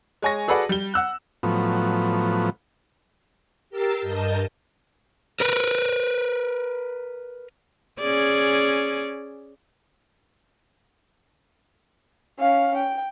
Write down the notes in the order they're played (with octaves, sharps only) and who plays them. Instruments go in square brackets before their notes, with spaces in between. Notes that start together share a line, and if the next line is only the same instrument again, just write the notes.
[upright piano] G#3 C#5 G#5 C#6 A#6
F#4 G#4 A4 B4 D5 F#5
G3 G7
F#5 E6 F#6
[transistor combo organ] A2 F3 F#3 B3
[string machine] G4 A#4 E6 A6 C7
G2 A#4 D#5 A5 G6
[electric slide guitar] A#4 B4
[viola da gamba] C#4 G#4 D5
[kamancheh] C#4 F5
G5